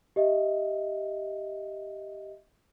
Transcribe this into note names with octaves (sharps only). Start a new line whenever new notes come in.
G4 D#5 E5